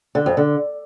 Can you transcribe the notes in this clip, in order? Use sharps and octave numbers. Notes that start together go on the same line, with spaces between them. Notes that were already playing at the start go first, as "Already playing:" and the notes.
D3
F2
D3